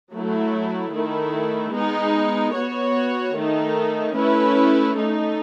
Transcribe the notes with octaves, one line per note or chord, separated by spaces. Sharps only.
F#3 A3 E4
D#3 A3 E4
G#3 B3 D#4
B3 F#4 C#5
D#3 A3 D#4
A3 C#4 E4 B4
A3 D#4 A4